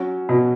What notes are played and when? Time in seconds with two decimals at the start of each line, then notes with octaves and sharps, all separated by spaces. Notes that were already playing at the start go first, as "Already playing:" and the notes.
Already playing: F#3 C#4 F#4 C#5
0.29 B2